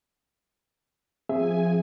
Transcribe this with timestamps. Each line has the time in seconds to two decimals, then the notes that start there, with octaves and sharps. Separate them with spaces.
1.29 F3 C4 G#4 E5 G#5